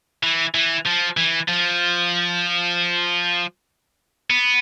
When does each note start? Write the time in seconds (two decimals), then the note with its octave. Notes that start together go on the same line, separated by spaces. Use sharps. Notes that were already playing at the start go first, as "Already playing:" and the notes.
0.23 E3
0.55 E3
0.86 F3
1.17 E3
1.48 F3
4.30 B3